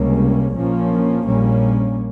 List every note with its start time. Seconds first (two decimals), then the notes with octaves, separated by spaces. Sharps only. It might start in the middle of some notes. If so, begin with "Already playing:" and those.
Already playing: C#2 C3 G3 A#3 C#4
0.54 A#1 A#2 F3 A#3 C#4
1.26 A#1 A#2 G3 A#3 C#4